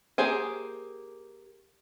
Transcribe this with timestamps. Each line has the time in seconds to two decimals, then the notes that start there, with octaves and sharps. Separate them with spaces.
0.18 A#3 G4 G#4 C5 G#5